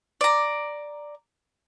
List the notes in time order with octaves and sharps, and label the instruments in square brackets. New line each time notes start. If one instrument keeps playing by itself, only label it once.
[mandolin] D5 A#5